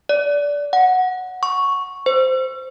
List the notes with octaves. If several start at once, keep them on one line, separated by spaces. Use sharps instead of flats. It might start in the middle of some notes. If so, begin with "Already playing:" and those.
D5
F#5
C#6
C5